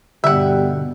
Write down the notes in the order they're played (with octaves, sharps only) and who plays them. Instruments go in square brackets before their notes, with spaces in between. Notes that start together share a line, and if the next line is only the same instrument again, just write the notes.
[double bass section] G2 B2 [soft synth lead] D3 [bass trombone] G3 [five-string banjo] E5 F#5